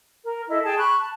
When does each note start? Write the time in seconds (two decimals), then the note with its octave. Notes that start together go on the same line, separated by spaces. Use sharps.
0.24 A#4
0.49 E4 A4 D#5
0.64 G#4 G5 A5
0.78 B5 C#6 F#6
0.98 A5